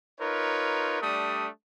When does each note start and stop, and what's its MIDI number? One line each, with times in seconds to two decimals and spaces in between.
0.21 0.99 63
0.21 0.99 65
0.21 0.99 70
0.21 0.99 71
0.21 0.99 73
1.02 1.48 55
1.02 1.48 57
1.02 1.48 62
1.02 1.48 87